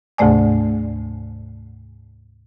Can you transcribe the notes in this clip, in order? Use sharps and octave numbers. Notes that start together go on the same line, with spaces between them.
D2 G#2 C3 A3 D5 G#5